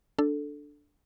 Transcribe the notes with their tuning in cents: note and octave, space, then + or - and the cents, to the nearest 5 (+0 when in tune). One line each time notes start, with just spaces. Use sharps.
D4 +0 A4 +0